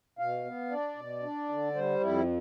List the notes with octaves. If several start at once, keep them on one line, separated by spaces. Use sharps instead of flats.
B2 F5
B3
D4 D5
B2
D4
D3
G3 C5
F2 E4